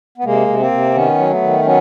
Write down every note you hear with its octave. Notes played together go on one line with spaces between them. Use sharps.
B3
C3 G#3 A#3
C3
A#3 C4
C3
D#3 B3 C#4
F#3
A3 B3
D#3
F#3 B3 C#4